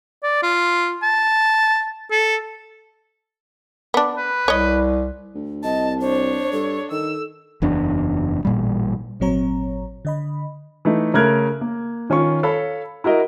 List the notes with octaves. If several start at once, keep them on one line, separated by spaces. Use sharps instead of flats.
D5
F4
A5
A4
B3 D4
B4
C2 C#5 D#5
D2
C2 D#5 A5
D4 C5 C#5
G2 A4
D#3 A4 E6
F#1 E2 D4
A1 A#2 G3
G#1 A#2 F#3 C4 C#5 A#5
D3 D#5 B5
E3 A3 D#4
C#3 A3 A#4 F6 F#6 G#6
A#3
D#3 C#4 F4 C#6
A4 C#5 F5 B5
E4 F#4 A#4 D#5